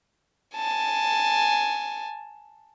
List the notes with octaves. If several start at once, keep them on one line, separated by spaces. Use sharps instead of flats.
G#5 A5